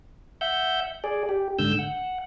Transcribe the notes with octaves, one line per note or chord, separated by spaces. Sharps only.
E5 F#5 G6
G#4 D5
G4
G#2 D3 E6 G6
F#5